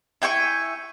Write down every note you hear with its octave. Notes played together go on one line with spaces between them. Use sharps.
E4 G5 G#5 C#6